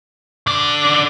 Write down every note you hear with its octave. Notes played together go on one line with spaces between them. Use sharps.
D3 D5